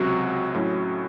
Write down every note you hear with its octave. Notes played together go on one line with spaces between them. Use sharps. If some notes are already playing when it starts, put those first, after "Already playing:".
Already playing: C#2 C3 F#3 C#4 F#4
A2 F#3 C#4 E4